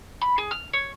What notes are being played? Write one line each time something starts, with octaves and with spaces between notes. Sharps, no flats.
B5
G#4
F6
C#5